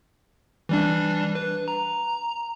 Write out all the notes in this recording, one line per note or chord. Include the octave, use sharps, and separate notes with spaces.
E3 G3 D4
B4
A#5